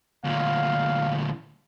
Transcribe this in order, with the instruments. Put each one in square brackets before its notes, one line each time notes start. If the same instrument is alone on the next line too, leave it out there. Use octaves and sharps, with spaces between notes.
[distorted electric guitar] D2 A#2 [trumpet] F5